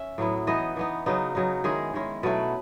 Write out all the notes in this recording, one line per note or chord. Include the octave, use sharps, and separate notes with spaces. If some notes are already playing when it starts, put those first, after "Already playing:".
Already playing: C#4 E5
A2 F#3 B3 E4
E3 B3 D#4 D#5
E3 B3 D#4
C#3 F#3 B3 D#4
C#3 F#3 B3 D#4
D#3 G#3 C#4 E4 G#4
D#3 G#3 C#4 E4
B2 F#3 A3 E4 B4